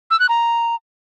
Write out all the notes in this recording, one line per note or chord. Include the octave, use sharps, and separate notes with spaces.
E6
F#6
A#5